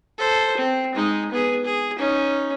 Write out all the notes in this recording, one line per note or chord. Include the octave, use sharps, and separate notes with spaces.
A4 C5
C4
G#3 D#4
B3 G#4
G#4
C#4 D#4